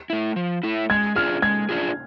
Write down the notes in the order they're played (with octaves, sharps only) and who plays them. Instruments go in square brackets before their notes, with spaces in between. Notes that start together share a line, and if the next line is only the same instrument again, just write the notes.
[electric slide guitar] A3 E4
F3
A3 E4
[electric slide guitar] G#3 [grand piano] G#6
[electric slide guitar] D4 F4 G#4 [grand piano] F6
[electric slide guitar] G#3 [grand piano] G#6
[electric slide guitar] D4 F4 G#4